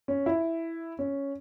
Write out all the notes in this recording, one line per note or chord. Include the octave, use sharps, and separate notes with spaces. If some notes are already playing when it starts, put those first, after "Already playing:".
C#4
E4
C#4